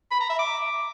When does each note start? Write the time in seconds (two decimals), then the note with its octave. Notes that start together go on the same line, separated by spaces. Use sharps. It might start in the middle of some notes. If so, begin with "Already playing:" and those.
0.11 B5
0.21 A#5
0.30 E5
0.39 D6